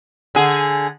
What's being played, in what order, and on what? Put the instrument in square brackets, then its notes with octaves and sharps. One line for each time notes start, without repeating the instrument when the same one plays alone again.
[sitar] D3 G#4